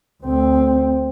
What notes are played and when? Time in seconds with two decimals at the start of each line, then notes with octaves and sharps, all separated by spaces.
0.23 D2 C4